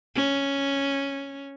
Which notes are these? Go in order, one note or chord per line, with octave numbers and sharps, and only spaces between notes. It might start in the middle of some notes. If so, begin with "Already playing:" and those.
C#4